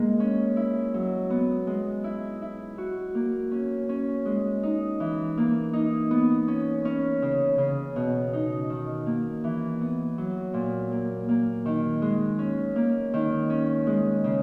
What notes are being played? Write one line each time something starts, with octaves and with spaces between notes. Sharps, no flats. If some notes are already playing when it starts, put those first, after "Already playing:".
Already playing: G#3 A#3
C#4
E4
F#3
B3
G#3
E4
E4
F#4
A#3
C#4
C#4
G#3
D#4
E3
A#3
D#4
B3
C#4
C#4
C#3
C#3
B2
D#4
D#3
A#3
E3
B3
F#3
A#2
A#3
A#3
D#3
G#3
C#4
A#3
D#3
C#4
G#3
C#3